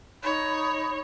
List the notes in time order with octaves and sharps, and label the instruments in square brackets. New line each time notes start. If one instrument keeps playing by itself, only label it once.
[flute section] D#4 B5 [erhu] C#5